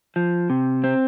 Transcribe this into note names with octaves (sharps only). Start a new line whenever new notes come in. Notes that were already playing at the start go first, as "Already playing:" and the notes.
F3
C3
C4